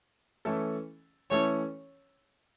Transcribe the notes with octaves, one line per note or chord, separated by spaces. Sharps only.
E3 A3 C#4 E4 A4
E3 A3 C#4 E4 A4 C#5